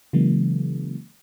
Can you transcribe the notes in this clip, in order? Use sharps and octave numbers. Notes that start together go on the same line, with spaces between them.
C#3 E3 F#3 G#3 A#3